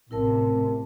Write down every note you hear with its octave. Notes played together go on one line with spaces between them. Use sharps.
A1 C3 E4 A#4 A5